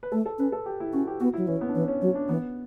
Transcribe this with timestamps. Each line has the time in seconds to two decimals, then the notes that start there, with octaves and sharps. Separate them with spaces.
0.03 B4
0.12 A3 A4
0.26 A4
0.39 C#4 B4
0.52 A4
0.66 G4
0.80 E4
0.93 C#4 F#4
1.07 G4
1.21 B3 F#4
1.34 E4
1.37 F#3
1.47 E3 C#4
1.61 B3
1.69 D4
1.74 E3 C#4
1.88 C#4
2.02 F#3 C#4
2.15 D4
2.28 E3 B3